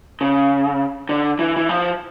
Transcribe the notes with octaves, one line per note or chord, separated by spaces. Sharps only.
C#3
D3
E3
E3
F3